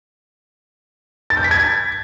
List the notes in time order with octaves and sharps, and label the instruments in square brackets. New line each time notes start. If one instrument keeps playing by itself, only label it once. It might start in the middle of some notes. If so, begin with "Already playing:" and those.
[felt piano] A6
G6
B6
G#6